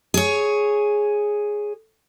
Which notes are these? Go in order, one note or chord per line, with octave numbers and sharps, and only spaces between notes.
G#4 C#5